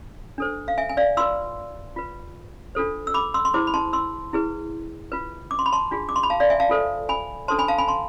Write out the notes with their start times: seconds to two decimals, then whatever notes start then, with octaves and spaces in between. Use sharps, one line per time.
0.38 D4 A4 C5
0.68 F5
0.78 E5 G#5
0.90 G#5
0.97 D5 F5
1.17 F4 B4 C6 E6
1.96 F4 B4
2.75 D4 F4 A4 C5
3.07 E6
3.14 B5 D6
3.34 C6 E6
3.45 C6
3.53 E4 G#4 C5 B5 D6
3.67 B5
3.74 A5 C6
3.93 C6 E6
4.33 E4 G#4 B4
5.12 F4 B4
5.51 D6
5.59 C6
5.66 B5
5.72 A5 C6
5.91 D4 F4 G#4
6.09 D6
6.16 C6
6.23 B5
6.30 F5 A5
6.40 D5 F5
6.50 E5 G#5
6.60 F5 A5
6.69 F4 A4 C5
7.09 G#5 B5
7.48 D4 A4 C5 A5 C6
7.58 G#5 B5
7.68 F5 A5
7.78 G#5 B5
7.88 A5 C6